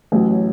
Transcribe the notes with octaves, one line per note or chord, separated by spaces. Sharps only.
A1 A2 F#3